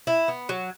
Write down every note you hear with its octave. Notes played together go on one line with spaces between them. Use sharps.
E4
B3
F#3